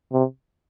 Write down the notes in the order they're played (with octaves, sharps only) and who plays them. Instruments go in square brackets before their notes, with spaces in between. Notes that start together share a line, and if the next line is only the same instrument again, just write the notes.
[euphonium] C3